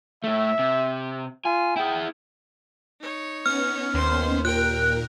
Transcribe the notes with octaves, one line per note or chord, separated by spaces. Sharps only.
A2 A3 E5
C3
F4 G#5
E4 G#4 G5
D#4 C#5
B3 C#4 F6
D#2 C5 C6
A#2 A#4 G5 F#6